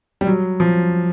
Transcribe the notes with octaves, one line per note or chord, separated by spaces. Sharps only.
G3
F#3
F3